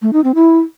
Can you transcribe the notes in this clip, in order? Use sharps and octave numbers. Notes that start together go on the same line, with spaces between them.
A3
D#4
C4
E4